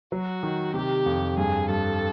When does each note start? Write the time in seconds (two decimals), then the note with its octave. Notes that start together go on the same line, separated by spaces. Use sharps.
0.12 F#3 F#4
0.43 D#3
0.74 C3 G4
1.06 F2
1.37 G2 G#4
1.69 G2 A4